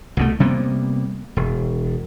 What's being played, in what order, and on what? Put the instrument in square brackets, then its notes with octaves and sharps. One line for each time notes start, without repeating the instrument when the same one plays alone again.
[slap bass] C2 B2 A3
C3 G3 A#3 B3
E1